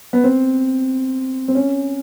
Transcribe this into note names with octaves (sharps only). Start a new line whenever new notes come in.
B3
C4
C4
C#4